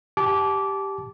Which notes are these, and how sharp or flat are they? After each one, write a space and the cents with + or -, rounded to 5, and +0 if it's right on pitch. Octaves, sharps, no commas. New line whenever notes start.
G4 +0 A5 -30 D6 -15